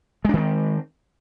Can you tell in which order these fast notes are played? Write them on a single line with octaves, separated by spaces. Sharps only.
G#3 D4 D#3 C4